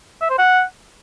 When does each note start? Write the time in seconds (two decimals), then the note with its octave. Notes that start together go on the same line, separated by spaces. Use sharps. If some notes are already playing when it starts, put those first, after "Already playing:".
0.22 E5
0.30 C5
0.38 F#5